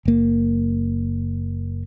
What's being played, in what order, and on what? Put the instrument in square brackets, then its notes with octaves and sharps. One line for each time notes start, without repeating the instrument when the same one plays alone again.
[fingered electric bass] F#1 A#3